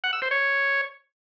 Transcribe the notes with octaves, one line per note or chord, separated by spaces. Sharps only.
F#5
E6
C5
C#5